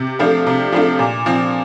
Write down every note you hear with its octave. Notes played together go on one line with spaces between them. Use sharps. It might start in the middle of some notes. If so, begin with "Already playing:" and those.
Already playing: C3
F3 A3 D4 F4
C3
F3 A3 D4 F4
A#2
F3 C4